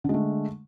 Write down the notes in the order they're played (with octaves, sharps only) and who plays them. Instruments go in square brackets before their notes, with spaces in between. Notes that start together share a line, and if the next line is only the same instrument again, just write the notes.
[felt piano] D3
G#3
A3